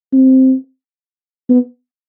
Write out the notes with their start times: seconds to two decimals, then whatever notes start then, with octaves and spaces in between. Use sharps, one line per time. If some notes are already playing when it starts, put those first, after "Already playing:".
0.13 C4
1.50 B3